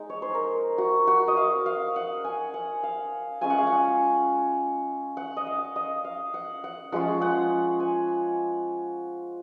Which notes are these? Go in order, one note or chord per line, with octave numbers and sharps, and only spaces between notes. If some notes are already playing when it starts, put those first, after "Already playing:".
Already playing: G#3 D#4
C#5
C5
A#4
F#4
F#4
D#5
F5
F5
F#5
G#5
F#5
F5
G#3 C#4 F4 G#5
F#5
F5
F#5
F#5
D#5
F5
D#5
F5
F#5
F#5
F3 G#3 C#4 F4 F#5
F#5
G#5